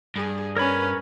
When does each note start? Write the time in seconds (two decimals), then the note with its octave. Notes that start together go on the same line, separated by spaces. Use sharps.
0.16 G2 G#4
0.57 C#4 A#4 B4 C#5 B5